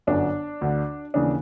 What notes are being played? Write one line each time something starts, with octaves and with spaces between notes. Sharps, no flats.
G1 F#2 D3 D4
D2 D3
D#2 C#3 E3 D4